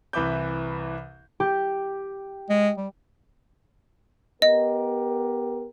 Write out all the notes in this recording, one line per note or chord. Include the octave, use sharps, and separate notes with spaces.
C2 E3 B4 E5 D6 G6
G4
G#3
G3
B3 G4 A#4 D#5